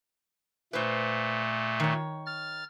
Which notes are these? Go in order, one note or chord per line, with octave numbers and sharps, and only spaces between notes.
A#2 A3 B4 C5
D#3 C#5
F6 A6